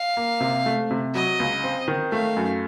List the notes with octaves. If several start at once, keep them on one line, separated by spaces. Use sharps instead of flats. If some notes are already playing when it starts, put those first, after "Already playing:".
Already playing: F5
A#3
C3
A3
C3
F#3 D#5
C#2
C4
D#3
A3 F5
F#2